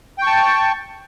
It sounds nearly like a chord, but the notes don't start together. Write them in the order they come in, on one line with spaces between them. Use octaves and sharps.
G5 C#6 A5